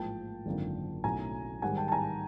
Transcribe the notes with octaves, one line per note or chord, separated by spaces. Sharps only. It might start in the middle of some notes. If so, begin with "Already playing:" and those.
Already playing: A1 G#2 F3 A#3 G5 A5
G#1 F#2 D3 F3 A#3
B1 A2 F#3 A3 C#4 G#5 A#5
G#2 D#3 G3 F#5 G#5
G5 A5
A5
G#5 A#5